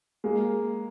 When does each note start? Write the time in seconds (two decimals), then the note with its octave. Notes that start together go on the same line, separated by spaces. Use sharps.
0.24 G#3 A#3